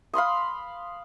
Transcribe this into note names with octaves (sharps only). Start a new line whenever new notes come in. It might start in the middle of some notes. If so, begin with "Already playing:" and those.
F5 B5 C6 D#6